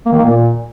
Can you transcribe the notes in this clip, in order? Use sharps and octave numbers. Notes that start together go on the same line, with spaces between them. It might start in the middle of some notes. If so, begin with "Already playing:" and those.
A#3
D#3
A#3
A#2